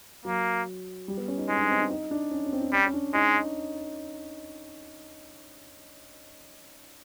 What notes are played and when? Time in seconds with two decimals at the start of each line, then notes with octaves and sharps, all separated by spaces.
0.25 F#3 A#3
1.08 G3
1.18 B3
1.28 C#4
1.38 D#4
1.48 G#3 D#4
1.55 C#4
1.59 D4
1.70 C4
1.80 D4
1.90 D#4
2.11 D4
2.31 C#4
2.46 C#4
2.53 C4
2.62 D4
2.73 G3 C#4
2.86 C#4
2.94 D4
3.14 G#3 D#4